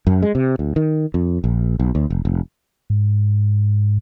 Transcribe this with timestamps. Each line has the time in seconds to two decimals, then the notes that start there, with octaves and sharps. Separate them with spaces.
0.07 F#2
0.22 G#3
0.35 C3
0.59 D2
0.76 D#3
1.14 F2
1.44 A#1
1.80 B1
1.95 D2
2.10 F1
2.25 F1
2.90 G#2